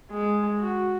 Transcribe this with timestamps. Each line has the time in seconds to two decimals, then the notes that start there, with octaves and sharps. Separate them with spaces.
0.11 G#3
0.59 F#4